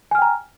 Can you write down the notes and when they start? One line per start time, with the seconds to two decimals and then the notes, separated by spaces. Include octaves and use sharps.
0.11 G#5
0.15 F6
0.18 G5
0.22 A#5